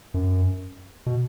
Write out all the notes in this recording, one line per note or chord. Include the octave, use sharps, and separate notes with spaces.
F#2
B2